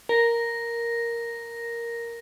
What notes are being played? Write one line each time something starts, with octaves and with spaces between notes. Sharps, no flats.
A#4 A#6